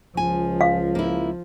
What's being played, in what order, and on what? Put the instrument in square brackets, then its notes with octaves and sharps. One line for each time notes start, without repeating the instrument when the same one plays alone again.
[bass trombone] C#2 [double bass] F3 [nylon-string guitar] G#5
[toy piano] F5
[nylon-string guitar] A#3 E4